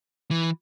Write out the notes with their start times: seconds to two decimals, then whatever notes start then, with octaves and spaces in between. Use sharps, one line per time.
0.31 E3